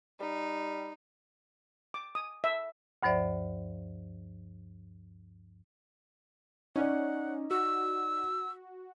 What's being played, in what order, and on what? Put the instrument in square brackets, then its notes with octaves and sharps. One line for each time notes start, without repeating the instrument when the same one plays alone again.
[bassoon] G3 [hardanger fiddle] D#4
[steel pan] D6
D#6
E5
[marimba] D2 G2 F3 C5 D5 E5
[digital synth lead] C#4 [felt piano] D#4 D5 [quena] F#5
[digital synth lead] F#4 [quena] E6